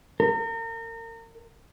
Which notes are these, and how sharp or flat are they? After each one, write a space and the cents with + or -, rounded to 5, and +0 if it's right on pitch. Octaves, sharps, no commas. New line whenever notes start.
A#4 -35